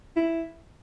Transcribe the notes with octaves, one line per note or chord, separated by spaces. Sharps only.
E4